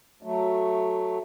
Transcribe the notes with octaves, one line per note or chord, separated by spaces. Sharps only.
F#3 A3